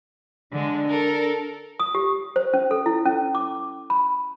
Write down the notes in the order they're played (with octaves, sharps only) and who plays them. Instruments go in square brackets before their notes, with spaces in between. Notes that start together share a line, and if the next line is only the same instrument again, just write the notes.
[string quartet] D3 G#3 [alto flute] D4
[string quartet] A4 A#4
[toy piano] D#6
G4
C5
C#4
A4
E4
C#4
D6
B5